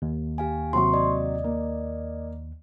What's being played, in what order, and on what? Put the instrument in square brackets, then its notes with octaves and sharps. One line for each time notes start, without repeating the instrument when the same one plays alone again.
[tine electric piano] D#2
[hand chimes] G4 F5 G#5
[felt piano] C3 F#3 [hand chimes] C6 C#6
[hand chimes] D5 D#5
[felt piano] A#3